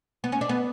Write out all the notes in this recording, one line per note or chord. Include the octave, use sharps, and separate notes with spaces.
B3
C#4
D4
B3